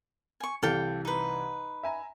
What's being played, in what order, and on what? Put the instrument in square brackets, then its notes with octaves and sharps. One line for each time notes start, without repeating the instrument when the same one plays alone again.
[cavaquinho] G#5 C#6
[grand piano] C2 E3 G3 [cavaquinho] A4 F5 G5
[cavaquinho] D#4 B4
[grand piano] E5 G#5 A#5